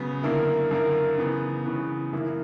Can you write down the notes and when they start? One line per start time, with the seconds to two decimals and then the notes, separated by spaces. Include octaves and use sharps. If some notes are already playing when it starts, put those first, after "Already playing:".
Already playing: C#3 F#3 B3
0.23 F#2 D3 A#3 E4 A#4
0.71 F#2 D3 A#3 E4 A#4
1.18 C#3 E3 B3
1.66 C#3 E3 B3
2.13 F#2 E3 A#3 E4